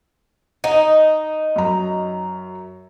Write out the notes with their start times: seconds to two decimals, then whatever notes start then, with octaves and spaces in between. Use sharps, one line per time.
0.64 D#4 D#5
1.56 F#2 A#5